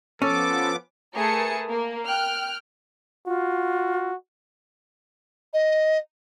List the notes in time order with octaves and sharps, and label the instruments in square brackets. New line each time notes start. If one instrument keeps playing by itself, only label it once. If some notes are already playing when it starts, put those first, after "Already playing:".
[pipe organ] F3 B3 D6 [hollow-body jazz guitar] C#4 [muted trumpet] A4
[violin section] A3 G#4 A#4 B4 A5 C#7
A#3
G5 F6 F#6
[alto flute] F4 [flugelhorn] F#4
[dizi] D#5